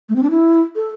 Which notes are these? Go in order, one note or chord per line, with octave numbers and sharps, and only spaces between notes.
A3
C4
D4
E4
A4